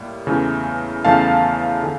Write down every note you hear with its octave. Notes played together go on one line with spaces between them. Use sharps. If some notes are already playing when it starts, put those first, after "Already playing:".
Already playing: A2 G3 A#3
E2 C#3 E3 A3
E2 C#3 E3 A3 F5 A5
D3